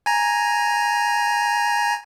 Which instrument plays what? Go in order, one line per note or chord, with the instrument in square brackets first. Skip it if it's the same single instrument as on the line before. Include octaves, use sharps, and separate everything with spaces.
[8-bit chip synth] G#5 A#5